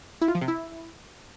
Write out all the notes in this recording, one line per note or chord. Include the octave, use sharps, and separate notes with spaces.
E4
F4
F3
C3
E4